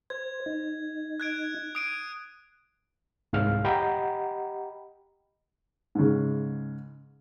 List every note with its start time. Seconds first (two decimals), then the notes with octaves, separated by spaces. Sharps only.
0.10 C5 G#6
0.46 D#4
1.20 F#6 G#6 D7
1.75 D#6 D7 D#7
3.33 C2 G#2 F5 F6
3.64 G4 D#5 F#5 G5 A#5 B5
5.95 G#2 C#3